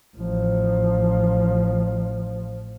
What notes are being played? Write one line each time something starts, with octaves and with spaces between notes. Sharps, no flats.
A1 F3